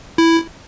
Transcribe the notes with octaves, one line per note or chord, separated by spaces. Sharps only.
E4